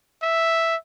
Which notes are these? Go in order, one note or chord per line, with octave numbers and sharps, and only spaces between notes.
E5